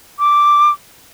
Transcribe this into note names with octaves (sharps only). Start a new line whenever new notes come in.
D6